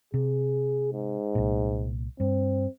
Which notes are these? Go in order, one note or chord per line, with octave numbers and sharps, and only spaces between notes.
C3 G#4
G#2
C2 A#2
G2 C4